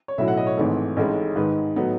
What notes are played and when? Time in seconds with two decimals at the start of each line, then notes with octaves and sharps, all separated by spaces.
0.08 C#5
0.18 B1 A2 F#3 C#4 E4 E5
0.28 F#5
0.37 D#5
0.47 C#5
0.57 G#1 G#2 E3 A3
0.97 A1 A2 G#3 D#4
1.36 G#2 D#3 G#3 D#4 B4
1.76 A2 F#3 B3 D#4